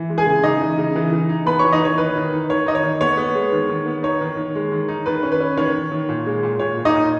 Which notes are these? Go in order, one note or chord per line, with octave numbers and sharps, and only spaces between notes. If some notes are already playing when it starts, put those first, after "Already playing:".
Already playing: E3
G#3
G#4 G#5
C#3
C#3 D#4 D#5
E3
C#3
E3
E3
D#4
B3 B4 B5
E3 C#5 C#6
D#4 D#5
E3 C#5
D#3 B4
D#3
D#4
D#3 C#5
D#4 D#5
C#5
D#3
B3 C#5
B3
G#3
D#3
D#3
B3
D#4 C#5
D#3
D#3
G#3
D#3
D#4
D#3 B4
C#4
B4
C#4
D#3 C#5
D#3
D#3
A#2
G#3
A#2
A#2 C#5
A#2
D#4 D#5
A#2